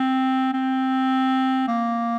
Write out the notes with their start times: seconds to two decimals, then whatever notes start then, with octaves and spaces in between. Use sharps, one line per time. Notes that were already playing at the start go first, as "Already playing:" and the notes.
Already playing: C4
0.54 C4
1.68 A#3